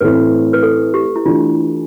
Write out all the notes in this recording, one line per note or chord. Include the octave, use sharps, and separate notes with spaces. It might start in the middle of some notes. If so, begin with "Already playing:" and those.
A2 E3 A3 C4 E4 B4
B4
A4
G4
E4
E3 A3 D4 F4